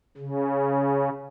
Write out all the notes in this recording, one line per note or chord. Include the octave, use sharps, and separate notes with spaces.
C#3